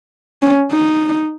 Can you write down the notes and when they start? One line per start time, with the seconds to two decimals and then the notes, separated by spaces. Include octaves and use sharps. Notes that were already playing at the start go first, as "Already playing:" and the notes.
0.42 C#4
0.72 D#4